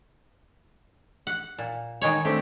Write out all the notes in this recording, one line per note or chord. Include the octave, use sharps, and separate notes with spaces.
F#5
A#2
D#3 G#3 C#5
A3 C4 D4 G4